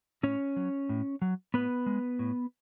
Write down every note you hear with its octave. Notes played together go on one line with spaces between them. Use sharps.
A2 C#4 C#5
F#3
A2
F#3
A2 B3 B4
G#3
A2